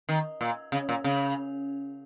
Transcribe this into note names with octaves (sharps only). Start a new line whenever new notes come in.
D#3
A#2
C#3
A#2
C#3